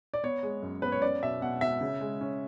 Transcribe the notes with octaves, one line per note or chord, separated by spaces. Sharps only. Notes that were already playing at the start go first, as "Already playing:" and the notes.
D5
B3 C#5
G#3
F#2
B3 B4
C#5
C#4 D5
B2 E5
B2 F#5
B2 E5
C#3
G#3
C#4